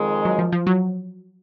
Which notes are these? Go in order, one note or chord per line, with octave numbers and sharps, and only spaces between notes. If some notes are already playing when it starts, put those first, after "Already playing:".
Already playing: F2 D#3 G#3
F#3
F3
F3
F#3